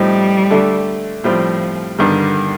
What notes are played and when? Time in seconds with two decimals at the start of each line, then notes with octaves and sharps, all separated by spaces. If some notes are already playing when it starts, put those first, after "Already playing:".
Already playing: A2 F3 G3 C4 D#4
0.50 D3 A3 D4 A4
1.24 A2 F3 G3 C4 F4
1.99 G2 D3 D#3 G3